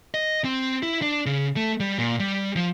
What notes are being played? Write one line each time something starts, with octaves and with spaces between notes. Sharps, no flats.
D#5
C4
E4
D4
C#3
A3
G3
A#2
G3
F3